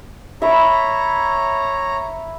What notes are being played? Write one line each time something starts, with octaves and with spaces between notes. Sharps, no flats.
C#5 E5 A#5 B5